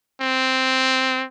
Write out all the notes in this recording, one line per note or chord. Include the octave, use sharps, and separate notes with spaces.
C4